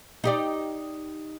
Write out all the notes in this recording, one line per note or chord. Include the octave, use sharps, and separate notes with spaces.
D#4 G4 D5